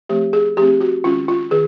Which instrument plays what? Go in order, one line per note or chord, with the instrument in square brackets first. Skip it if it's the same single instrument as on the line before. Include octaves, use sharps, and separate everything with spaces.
[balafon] F3 A3 C4 G4
G#4
F3 A3 C4 G4
F#4
D#3 G#3 C#4 F4
F4
D#3 G#4